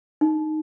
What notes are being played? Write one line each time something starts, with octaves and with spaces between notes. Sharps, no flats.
D#4